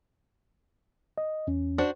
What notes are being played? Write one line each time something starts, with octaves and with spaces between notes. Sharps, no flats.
D#5
E2 C#4
D4 F#4 C5